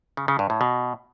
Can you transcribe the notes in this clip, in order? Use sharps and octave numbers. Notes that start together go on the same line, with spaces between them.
C#3
C#3
G2
A2
B2